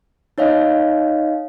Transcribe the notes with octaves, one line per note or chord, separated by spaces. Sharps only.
D#4 C#5 D#5 F5